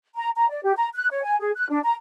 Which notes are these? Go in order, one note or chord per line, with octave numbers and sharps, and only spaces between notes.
A#5
A#5
D5
G4
A#5
F#6
C#5
G#5
G#4
F#6
D4
A#5